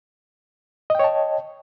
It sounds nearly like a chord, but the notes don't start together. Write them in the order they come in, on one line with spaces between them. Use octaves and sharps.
D#5 G5 C#5 A5